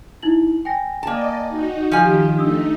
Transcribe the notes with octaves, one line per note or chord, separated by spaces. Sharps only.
D#4 E4 F#7
G5 G#5 A#6
A#3 D5 D#5 A5
D#4 F#4
D#3 F3 G4 G#5 F6
A3 D4 D#4 D#6 E6